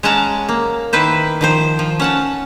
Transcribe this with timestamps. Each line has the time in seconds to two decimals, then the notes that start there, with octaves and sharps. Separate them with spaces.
0.03 G#3 C#4 C#5 F#5 A5 A#5
0.49 A#3
0.93 D#3 E4 B4 C5
1.41 D#3 F3 C5
1.79 F3
2.00 C#4 F#5 A5